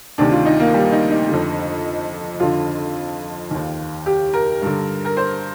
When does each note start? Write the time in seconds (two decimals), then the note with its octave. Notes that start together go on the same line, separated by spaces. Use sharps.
0.18 D2 C3 D#3 D4
0.32 F4
0.46 D#4
0.60 A#3
0.74 G3
0.92 D#4
1.11 D#4
1.29 F2 D3
2.40 F2 D3 F4
3.51 D#2 D#3
4.06 G4
4.34 A#4
4.62 G2 D3
5.05 A#4
5.17 C5